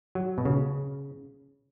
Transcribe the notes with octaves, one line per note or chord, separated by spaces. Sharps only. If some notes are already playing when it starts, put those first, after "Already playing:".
F#3
B2
C#3